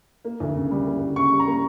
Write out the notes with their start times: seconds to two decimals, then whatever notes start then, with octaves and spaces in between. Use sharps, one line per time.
0.25 A#3
0.40 D2
0.56 C#3
0.71 G3
0.86 A#3
1.01 D2
1.16 C#3 C#6
1.31 G3
1.39 A#5
1.47 A#3